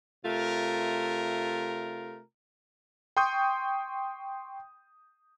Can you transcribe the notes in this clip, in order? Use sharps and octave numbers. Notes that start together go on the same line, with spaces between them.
C3 A3 F4 A#4
G5 C6 C#6 D#6 G6